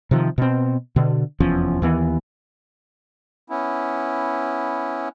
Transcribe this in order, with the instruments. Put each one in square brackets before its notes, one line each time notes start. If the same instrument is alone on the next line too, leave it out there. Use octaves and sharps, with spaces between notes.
[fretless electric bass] C3 D#3 F3
B2 C4
B2 D3
F1 E2 F3 C#4
D#2 E3 B3
[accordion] B3 C#4 E4